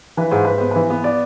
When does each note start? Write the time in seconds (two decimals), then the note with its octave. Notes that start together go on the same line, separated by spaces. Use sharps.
0.17 E3 B4
0.31 G#2 C5
0.45 G#2 B4
0.58 B3 C5
0.71 E3 B4
0.90 B3
1.04 D5